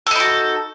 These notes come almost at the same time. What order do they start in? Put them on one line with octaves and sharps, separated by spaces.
A4 D#4 E4 F#4